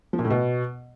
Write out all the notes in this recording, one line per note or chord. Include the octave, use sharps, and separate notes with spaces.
F3
A#2
A2
B2